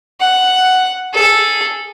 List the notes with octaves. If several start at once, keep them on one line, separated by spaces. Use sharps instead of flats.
F#5
G#4 A4